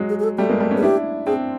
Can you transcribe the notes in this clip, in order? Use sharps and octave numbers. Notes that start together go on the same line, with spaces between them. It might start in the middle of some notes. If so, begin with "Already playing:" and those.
Already playing: F#3 G#3
G#4
G#4
A4
G3 A3 G4
G#3 A#3
G3 A3
B3 C#4
G#4
D4 E4 G4
C4 D4 G#4